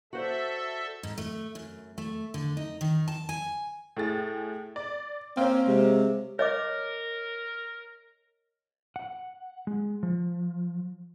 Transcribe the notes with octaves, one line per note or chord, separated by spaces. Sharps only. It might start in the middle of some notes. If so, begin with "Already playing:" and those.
F#4 A4 C5 D5 E5
G#2
A3
F#2
A3
D3
D#4
D#3
A5
G#5
A2 G#4 A6
D5
A#3 C4 C#4
C3 G#3
A#4 C#5 D#5 D6
F#5
G#3
F3